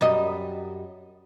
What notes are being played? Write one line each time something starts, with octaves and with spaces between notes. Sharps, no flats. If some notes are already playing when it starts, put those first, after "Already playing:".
F#2 G3 D#5